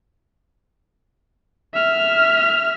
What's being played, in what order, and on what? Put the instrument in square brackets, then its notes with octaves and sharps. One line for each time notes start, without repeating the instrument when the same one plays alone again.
[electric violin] E5 F6